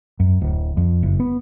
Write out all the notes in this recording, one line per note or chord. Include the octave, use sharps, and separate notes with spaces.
F#2
D1
F2
F#1
B3